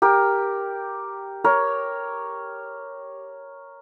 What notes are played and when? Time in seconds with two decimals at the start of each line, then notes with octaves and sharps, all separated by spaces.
0.02 G4 A#4
1.44 A#4 C#5